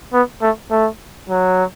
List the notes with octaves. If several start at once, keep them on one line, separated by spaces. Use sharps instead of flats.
B3
A3
A3
F#3